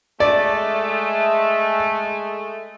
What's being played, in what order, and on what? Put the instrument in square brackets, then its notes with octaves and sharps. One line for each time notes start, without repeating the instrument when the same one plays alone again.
[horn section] G#3 A3 [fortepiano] D5